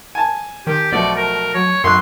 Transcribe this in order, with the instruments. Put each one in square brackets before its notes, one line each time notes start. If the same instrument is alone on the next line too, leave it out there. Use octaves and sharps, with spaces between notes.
[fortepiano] G#5 A5
[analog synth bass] D#3 [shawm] G4
[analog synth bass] B1 [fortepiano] B2 F3 A3 [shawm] D5
[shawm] A#4
[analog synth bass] F#2 [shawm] C#5
[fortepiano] B1 C#6 F#6 [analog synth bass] F#2 [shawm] C6